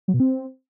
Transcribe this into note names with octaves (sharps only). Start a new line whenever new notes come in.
F#3
B2
C4